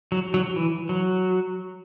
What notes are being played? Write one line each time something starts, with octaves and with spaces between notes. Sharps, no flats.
F#3
F#3
E3
F#3